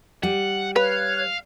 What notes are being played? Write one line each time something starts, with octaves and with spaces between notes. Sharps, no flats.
G3 F#5
B4 C#5 F5 F#6